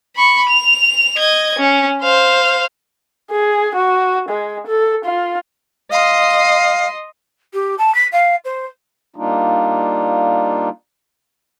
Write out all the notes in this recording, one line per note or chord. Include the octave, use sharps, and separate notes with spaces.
B5 C#6
F7
D#5 G#6
C#4
C5 F5
G#4
F#4
G#3
A4
F4
D#5 F5 C6
G4
A5
B6
F5
C5
G3 A#3 D4 D#4 F4